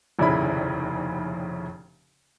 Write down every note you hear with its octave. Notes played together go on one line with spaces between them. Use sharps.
F1 A#1 D#2 C#3 E4 B5